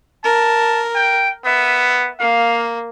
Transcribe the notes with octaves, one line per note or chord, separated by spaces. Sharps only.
A#4 A5
G5
B3 E5
A#3 F5